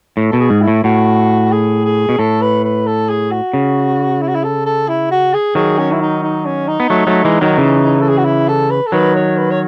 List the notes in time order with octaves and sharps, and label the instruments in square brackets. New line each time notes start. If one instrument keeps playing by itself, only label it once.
[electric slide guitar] A2
[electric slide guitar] B2 [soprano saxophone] A4
[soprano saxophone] G#4
[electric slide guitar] G#2
[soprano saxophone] E4
[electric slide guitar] A2
[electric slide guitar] A2 [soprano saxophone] F#4
[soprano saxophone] G#4
G#4
[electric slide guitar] B2
[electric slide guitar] A2 [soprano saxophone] A4
[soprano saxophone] B4
B4
A4
G#4
F#4
[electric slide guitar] C#3
[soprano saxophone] E4
F#4
E4
A4
A4
E4
F#4
G#4
[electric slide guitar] D#3 F#3 [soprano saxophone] G#4
[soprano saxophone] C#4
E4
D#4
D#4
C#4
D#4
[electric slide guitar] B3
F#3 A3
F#3 A3
E3 G#3
D#3 F#3
C#3 E3
[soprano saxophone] A4
G#4
F#4
E4
A4
B4
A4
[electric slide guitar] D#3 F#3 [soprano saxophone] B4
[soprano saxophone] C#5
B4
C#5